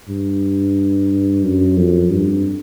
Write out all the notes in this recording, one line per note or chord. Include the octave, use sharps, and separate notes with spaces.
G2
F#2
F2
G2